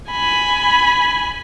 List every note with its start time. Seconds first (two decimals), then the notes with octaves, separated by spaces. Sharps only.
0.12 G#5 B5